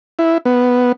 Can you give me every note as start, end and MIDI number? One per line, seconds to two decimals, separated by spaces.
0.19 0.38 64
0.45 0.92 59